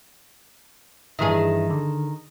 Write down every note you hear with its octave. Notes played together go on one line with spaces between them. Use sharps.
G2 D#3 E3 G#4 E5
D3